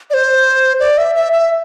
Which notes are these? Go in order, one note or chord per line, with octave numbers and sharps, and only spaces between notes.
D5
C5
D5
E5
E5
E5